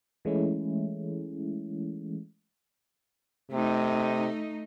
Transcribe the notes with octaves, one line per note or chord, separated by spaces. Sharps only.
E3 G#3 A3 C#4 E4
C3 A3 D#4